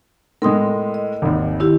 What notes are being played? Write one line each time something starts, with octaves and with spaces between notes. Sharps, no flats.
A2 G#3 A#4 C6 D#6
D#5
G#1 D#2
D#3 E4 G4